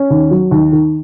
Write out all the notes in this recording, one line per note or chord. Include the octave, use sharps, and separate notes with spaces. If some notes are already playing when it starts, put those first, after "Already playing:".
Already playing: C#4
D#2
F#3
D#2
D#3